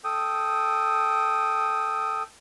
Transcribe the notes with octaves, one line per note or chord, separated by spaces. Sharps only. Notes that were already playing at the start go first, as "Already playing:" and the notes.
A4 G5 D#6